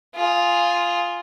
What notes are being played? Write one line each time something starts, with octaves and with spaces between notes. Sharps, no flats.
F4 G#4